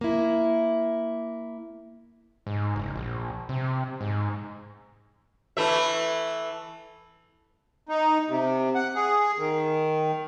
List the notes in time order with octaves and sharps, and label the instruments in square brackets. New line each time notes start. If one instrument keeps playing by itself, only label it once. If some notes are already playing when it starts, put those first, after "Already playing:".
[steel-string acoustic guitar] A#3 E4
[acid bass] G#2
F#1
A#1
C3
G#2
[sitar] E3 A3 E5
[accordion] D#4
C3
F#5
G#4
D#3